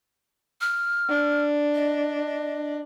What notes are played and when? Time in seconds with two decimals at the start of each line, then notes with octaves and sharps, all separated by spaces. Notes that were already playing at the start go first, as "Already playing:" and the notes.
0.61 F6
1.09 D4
1.74 D#5